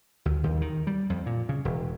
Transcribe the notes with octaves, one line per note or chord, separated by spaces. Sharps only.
D2
D#2
D#3
G3
F2
A#2
C#3
E1